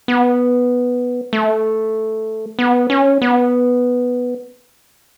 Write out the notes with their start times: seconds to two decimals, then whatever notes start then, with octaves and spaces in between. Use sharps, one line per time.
0.08 B3
1.33 A3
2.59 B3
2.90 C#4
3.22 B3